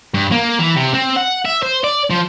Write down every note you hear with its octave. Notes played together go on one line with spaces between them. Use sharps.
G2
A#3
E3
C3
C4
F#5
E5
C5
D5
F3